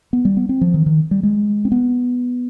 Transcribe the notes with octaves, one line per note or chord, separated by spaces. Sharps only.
B3
G3
B3
C4
F3
D#3
D#3
G3
G#3
C4
B3